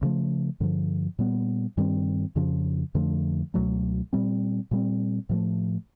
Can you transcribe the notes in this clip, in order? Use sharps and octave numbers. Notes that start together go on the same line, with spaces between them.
D2 C#3 F3 A3
G2 D3 F3
A#2 G3 B3
G2 D#3 G3 C4
F2 C#3 F3
F2 D3 F3 A3
C#2 B2 F#3 A3
A#2 G3 C4
A#2 G3 C4
A2 F3 A3